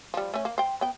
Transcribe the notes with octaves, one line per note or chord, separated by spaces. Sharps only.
F3 G3
A3 C#4
A#3
C5 G5
B3 G5